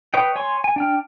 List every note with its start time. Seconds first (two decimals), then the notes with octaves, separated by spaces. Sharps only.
0.14 B4 C#5 D#5 G5
0.36 C#5 G#5 C6 C#6
0.64 G#5
0.76 D4 G5 F6